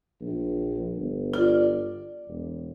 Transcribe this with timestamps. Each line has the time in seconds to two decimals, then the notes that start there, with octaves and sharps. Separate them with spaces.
0.21 A#1
0.96 G1
1.33 F4 D5
2.27 E1